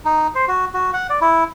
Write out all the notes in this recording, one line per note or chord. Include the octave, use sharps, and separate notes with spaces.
D#4
C5
F#4
F#4
F#5
D5
E4